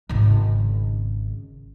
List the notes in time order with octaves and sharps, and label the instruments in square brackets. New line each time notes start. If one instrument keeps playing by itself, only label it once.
[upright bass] G#1 C#3